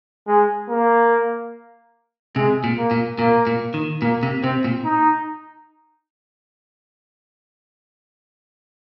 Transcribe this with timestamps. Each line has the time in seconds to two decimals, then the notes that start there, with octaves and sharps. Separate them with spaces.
0.27 G#3
0.69 A#3
2.36 C3 G#3
2.64 A#2
2.78 A#3
2.91 A#2
3.19 A#2 A#3
3.47 A#2
3.74 D#3
4.02 A#2 A#3
4.23 C3
4.44 C3 C4
4.64 A#2
4.85 D#4